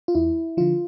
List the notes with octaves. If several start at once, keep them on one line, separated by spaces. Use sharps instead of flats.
F4
E2 E4
D3 F3 F4